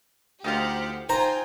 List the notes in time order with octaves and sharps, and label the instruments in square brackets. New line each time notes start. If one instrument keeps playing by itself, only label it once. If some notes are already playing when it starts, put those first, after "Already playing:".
[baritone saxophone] D2 [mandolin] D#4 F4 F5 [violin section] G4 C5 F#5
[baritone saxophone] D#4 [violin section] F4 G5 G#5 [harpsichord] C5 [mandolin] A#5